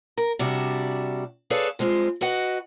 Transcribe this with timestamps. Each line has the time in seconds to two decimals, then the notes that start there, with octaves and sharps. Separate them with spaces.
0.18 A#4
0.39 C3 G3 D4 F#4
1.50 G#4 A4 B4 C#5 D5 F5
1.79 G2 G#3 C4 F4 C5
2.21 F#4 B4 D#5 F#5